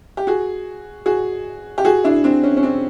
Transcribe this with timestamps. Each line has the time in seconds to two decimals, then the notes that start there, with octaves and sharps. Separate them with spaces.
0.17 G4
0.27 F#4 G#4
1.06 F#4 G#4
1.78 G4
1.85 F#4 G#4
2.04 D4 E4
2.24 C4 D4
2.43 C#4
2.57 C#4
2.63 C4 D4